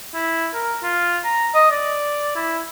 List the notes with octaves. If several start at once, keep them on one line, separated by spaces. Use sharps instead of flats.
E4
A#4
F4
A#5
D#5
D5
E4